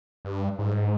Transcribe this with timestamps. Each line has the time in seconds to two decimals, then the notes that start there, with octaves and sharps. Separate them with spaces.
0.25 G2
0.59 G#2